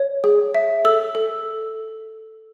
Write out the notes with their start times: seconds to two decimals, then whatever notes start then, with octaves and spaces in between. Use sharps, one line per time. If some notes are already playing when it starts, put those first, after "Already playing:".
Already playing: C#5
0.24 G#4
0.55 E5
0.85 A4 E6
1.15 A4